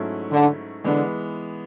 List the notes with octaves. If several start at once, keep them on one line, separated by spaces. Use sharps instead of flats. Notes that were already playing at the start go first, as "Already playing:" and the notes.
Already playing: G#2 F#3 A3 C#4 E4
D3
D3 E3 G#3 B3